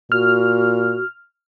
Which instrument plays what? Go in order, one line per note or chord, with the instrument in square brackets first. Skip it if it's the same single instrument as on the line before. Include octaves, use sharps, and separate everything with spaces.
[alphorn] A#2 [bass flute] F#4 [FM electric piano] F6